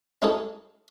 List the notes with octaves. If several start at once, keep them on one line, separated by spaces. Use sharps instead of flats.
C#4 D#4 E4 G#4 A4 C#5